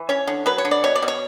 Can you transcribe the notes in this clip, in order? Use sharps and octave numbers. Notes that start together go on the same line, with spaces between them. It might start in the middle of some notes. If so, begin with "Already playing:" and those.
Already playing: E3
C#4 C#5
D3
F#3 B4
C#5
D3
D5
B2 C#5
D5
B2
C#5